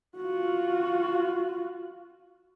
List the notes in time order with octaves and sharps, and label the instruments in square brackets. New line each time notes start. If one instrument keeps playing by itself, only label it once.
[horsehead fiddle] F4 F#4